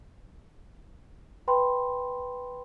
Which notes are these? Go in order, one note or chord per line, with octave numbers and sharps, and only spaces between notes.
B4 G5 B5 C6